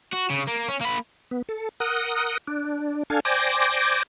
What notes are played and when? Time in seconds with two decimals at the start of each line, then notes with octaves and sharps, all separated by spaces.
0.13 F#4
0.30 C#3
0.48 A#3
0.68 C#4
0.81 A#3 B5
1.31 B3
1.49 A4
1.80 A#4 F#5 D#6
2.47 D4
3.10 D4 A4 F5 G#5
3.25 C5 D5 G5 G#5 D6 A#6